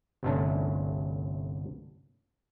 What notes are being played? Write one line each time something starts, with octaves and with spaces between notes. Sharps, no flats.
G1 C2 A3 C#4 D4 A5